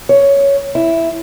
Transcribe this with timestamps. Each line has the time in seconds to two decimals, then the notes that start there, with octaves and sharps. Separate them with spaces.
0.09 C#5
0.75 E4